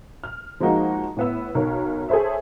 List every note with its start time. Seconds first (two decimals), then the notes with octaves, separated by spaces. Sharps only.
0.24 F6
0.60 F3 G#3 A#3 D#4 F#4
1.17 A2 B3 E6
1.55 B1 A#4 C#5
2.09 G#4 A4 C5 C#5 E5